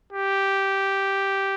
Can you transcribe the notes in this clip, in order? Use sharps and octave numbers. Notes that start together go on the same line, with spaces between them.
G4